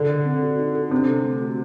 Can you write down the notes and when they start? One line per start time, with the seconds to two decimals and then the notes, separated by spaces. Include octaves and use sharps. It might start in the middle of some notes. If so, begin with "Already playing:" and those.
Already playing: D3
0.09 A4
0.25 C4
0.43 F#4
0.59 D#4
0.75 A4
0.91 C3 D4
1.09 A4
1.24 A3
1.42 F#4